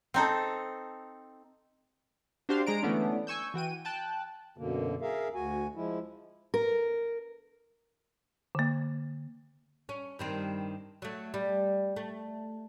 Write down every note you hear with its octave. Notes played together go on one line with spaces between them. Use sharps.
C4 D#4 A4
D4 F#4 G4 C5 F5 C6
G#3 A#5 D7
D3 E3 A3 B3 C#4 D4
G#5 C#6 E6 G6
E3 F#4 G5 D#7
G5 A5 F#6
F#2 B2 D3 A#3
G#4 A#4 E5 F5
D2 F#4 G#5
F3 G#3 E4
A#4
D3 A#3
C#4
G2 D#3 C4
F#3 A3
G3
A3